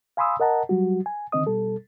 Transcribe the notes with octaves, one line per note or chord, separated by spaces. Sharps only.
F5 G#5 B5 C6 D#6 E6
A#4 D#5 F#5 A5 A#5
F#3 G3 F#4
G#5
D3 D#3 C4 D#5 D#6
B2 G3 A4